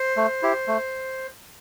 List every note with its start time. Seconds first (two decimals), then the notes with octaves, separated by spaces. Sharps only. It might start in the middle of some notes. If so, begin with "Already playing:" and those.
Already playing: C5
0.17 A3
0.42 E4 G4
0.67 A3